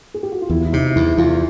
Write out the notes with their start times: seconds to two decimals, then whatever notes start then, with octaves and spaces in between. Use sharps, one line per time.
0.14 G#4
0.23 G4
0.32 F#4
0.41 F4
0.49 E2 E4
0.65 E4
0.72 C3 D#4
0.95 E2 E4
1.17 E2 F4